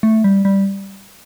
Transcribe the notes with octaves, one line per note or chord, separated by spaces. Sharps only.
A3
G3
G3